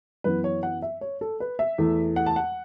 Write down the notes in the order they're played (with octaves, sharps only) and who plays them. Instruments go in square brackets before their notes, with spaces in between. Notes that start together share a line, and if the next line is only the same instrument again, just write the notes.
[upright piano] F#2 E3 B3 B4
C#5
F#5
E5
C#5
A4
B4
E5
E2 E3 A3
F#5
A5
F#5